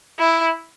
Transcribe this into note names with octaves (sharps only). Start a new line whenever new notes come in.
E4